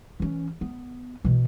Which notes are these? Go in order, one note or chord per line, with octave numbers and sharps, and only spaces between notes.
E3 C#4
B3
B2 E3